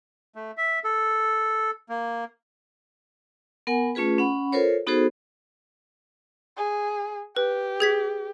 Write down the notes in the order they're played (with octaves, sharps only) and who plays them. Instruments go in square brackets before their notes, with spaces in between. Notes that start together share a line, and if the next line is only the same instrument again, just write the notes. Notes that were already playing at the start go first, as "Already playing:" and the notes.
[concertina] A3
E5
A4
A#3
[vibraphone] B3 A#4 F#5 G#5 B5
A3 C#4 F4 G#4 B4
C#4 F#5 B5
F4 A4 A#4 C5 C#5
B3 D#4 F#4 G#4 A4 C5
[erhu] G#4
[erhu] G4 [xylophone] B4
[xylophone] G#4 G#6 B6